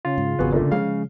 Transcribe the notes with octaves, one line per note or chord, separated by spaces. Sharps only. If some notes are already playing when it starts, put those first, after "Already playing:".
C#3 F4
G#2
G#1 F2 B3 F#4 G#4
A#2 D3 A3
C#3 F3 G#3 F5